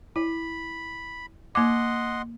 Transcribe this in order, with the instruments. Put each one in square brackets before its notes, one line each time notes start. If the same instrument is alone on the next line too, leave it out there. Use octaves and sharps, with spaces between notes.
[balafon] E4 [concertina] B5
[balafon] A#3 D6 [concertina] D#5 F#5 C6